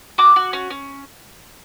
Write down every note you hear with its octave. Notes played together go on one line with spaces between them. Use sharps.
F#4 D6
F#4
C#4
C#4